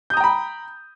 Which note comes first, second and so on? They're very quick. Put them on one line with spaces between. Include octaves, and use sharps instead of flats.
G6 D#6 A#5 G5 B5